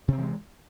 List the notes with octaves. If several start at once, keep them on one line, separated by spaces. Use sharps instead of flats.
C3 E3 G#3 C4